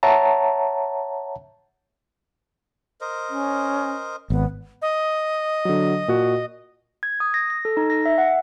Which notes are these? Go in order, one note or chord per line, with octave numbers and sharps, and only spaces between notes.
C#5 E5 F#5 A5 A#5
A#4 C5 D#5
C#4
G#1 B3
D#5
D3 F#3
A#2 F#4
G#6
D#6
A#6
A#6
A4
D#4
A#6
E5
F#5